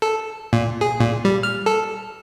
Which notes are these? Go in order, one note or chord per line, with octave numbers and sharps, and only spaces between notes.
A4
A#2
G#4
A#2
G3
F6
A4